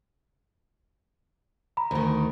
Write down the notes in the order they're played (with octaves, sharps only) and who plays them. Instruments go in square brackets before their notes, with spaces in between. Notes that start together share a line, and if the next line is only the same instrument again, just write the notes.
[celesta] A#5 B5
[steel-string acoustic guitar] D2 D#3